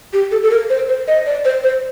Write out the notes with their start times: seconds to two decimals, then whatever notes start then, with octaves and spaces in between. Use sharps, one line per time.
0.13 G4
0.31 A4
0.43 A4
0.51 A#4
0.70 C5
0.89 C5
1.08 D#5
1.26 D5
1.45 C5
1.64 C5